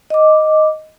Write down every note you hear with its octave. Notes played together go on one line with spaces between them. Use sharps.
D#5 D6